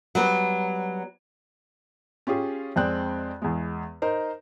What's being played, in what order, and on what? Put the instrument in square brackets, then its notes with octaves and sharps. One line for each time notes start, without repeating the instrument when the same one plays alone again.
[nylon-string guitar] F#3 G3 B3
[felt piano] C#4 F4 G4 G#4
F2 G#3 C4 D5 G5 F#6
E2 G#3
D#4 A#4 C5